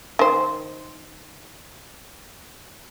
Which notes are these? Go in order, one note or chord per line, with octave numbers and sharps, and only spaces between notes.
D#3 C5